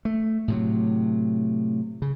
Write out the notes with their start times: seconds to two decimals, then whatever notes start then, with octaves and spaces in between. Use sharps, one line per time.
0.05 A3
0.48 A2 C3 F#3
2.02 C#3